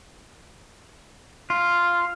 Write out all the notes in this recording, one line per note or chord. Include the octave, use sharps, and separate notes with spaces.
F4